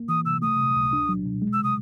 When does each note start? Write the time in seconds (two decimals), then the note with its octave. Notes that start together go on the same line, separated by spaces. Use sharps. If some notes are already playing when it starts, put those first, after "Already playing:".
Already playing: A#3
0.09 E3 D#6
0.26 C3 E6
0.42 A3 D#6
0.59 C3
0.76 C#2
0.93 D4
1.09 F#3
1.26 B2
1.42 G#3
1.53 E6
1.59 C3 D#6